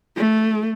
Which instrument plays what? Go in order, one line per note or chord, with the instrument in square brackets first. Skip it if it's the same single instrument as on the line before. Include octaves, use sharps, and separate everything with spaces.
[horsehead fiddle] A3